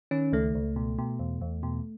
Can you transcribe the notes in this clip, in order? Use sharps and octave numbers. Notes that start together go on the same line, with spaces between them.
D#3 C#4
C#2 A3
C#2
B2
B2
E2
E2
B2